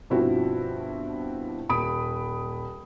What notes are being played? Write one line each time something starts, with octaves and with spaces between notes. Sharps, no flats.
G2 B2 F3 C4 E4 F#4
D#1 B5 D#6 D7